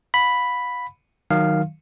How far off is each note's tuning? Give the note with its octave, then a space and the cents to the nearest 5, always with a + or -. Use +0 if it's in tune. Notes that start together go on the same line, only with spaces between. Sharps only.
F5 +40 B5 +0
D#3 +0 F#3 +0 F5 +0